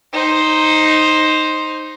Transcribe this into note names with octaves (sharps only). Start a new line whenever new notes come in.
D#4 C5